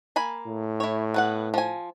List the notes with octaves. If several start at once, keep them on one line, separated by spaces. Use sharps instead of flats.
A#3 G#5 B5
A2
E4 C#5
B3 B4 F#5
F3 G#5